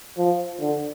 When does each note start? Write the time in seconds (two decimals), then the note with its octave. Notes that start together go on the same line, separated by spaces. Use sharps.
0.17 F3
0.60 D3